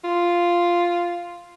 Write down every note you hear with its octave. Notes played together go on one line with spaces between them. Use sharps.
F4